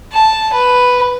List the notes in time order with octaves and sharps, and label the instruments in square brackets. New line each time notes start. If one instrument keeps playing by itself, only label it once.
[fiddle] A5
B4